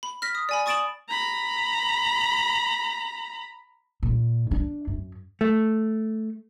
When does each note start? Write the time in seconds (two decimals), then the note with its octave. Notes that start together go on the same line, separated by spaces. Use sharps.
0.03 B5
0.22 F6 A#6 B6
0.35 D#6
0.49 D5 G#5 B5
0.66 C#6 D#6 A6 D7 E7 F#7
1.08 A#5 B5
4.03 A#2
4.51 D4
4.87 F#2
5.41 A3